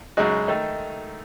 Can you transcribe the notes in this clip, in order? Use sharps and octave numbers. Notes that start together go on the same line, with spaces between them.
F#2 C#3 G#3 D#4 F#4
D#3 A3 D#4